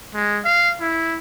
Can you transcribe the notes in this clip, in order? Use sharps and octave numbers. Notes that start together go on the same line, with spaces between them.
G#3
F5
E4